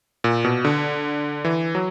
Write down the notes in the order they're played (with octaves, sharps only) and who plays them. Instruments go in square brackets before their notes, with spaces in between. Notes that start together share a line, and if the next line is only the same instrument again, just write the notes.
[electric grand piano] A#2
B2
D3
E3
F#3